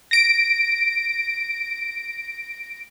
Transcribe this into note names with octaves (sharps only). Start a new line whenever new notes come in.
A#6 D7